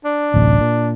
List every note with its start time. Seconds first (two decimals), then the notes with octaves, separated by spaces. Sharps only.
0.05 D4
0.34 D1 A1 C3
0.61 A#2